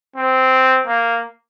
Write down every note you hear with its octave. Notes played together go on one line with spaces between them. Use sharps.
C4
A#3